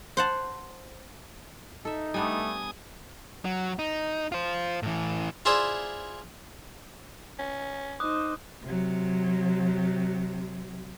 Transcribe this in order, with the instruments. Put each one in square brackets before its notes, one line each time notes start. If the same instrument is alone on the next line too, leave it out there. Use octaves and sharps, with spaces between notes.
[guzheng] C5 F#5 A5
[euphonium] D#4 [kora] A4 E5
[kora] G3 B3 D4 [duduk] A3 [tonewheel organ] G#5 D#6
[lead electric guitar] F#3
D#4
F4 C5
A2 E3
[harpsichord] E4 F4 G#4 C5 D5 E5
[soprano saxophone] C#4
[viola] D#4 C5 [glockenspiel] D6 D#6 F#6
[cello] C3 F#3